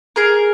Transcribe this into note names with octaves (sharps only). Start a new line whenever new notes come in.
G#4 A#4